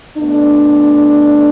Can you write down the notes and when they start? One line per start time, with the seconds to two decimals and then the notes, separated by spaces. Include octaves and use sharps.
0.17 B2 A3 D4